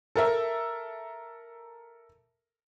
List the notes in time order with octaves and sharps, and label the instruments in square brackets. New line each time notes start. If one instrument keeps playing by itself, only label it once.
[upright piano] A4 A#4 E5